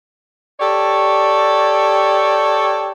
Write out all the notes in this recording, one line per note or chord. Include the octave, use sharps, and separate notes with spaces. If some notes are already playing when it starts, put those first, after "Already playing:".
G4 A4 C#5 D5